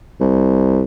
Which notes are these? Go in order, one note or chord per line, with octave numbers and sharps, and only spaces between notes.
C2